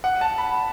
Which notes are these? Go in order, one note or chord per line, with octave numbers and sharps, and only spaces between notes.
F#5
A5
B5